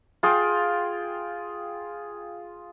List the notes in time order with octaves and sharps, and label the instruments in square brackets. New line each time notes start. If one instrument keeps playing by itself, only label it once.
[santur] F4 G#4 G5